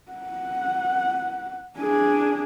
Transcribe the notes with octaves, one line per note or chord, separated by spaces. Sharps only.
F#5
D4 G#4